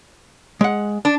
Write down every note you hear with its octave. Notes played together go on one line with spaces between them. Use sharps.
G#3 F#5
D4